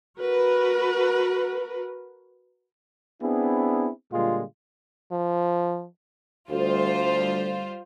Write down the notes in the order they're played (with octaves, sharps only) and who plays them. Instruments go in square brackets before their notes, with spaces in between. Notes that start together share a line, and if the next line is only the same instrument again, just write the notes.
[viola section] F#4 A#4 B4
[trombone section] B3 C4 D4 E4 G#4
A#2 D3 G3 G#3 F4
[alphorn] F3
[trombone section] D2 [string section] G3 F4 C5